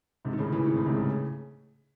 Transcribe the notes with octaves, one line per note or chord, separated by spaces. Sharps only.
G#2 C3
D#3
A2 C#3
C#3 E3
C3 D#3
A2 C#3
G#2 C3
A2 C#3